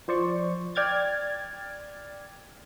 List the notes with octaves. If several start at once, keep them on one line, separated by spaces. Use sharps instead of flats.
F3 C5 D5 C#6
D5 G5 F6 G#6 A6